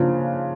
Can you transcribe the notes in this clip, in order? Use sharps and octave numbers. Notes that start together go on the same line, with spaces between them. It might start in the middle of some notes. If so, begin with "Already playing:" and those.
Already playing: C#3 F3 A#3 D4 F4